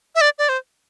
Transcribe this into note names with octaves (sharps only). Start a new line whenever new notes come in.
E5
D5
D5
C5